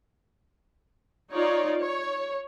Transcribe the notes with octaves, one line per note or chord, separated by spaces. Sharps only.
D#4 F4 C#5 D5
C#5